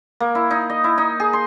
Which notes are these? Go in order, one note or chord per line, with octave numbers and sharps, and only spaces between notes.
A#3
E4
D#4
D#5
E4
D#4
G#4
C6